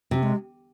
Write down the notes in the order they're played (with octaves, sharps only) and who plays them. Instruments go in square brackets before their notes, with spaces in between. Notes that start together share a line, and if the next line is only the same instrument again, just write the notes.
[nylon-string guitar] C3 [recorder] C4
[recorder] G#3